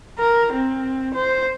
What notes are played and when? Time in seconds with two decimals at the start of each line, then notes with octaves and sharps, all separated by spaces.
0.19 A#4
0.53 C4
1.14 C5